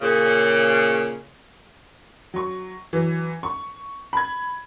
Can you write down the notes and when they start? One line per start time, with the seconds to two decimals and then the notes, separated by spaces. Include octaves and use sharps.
0.02 A#2 C#3
2.34 F#3 C#6
2.93 E3 F#3
3.43 C#6
4.13 B5 G#6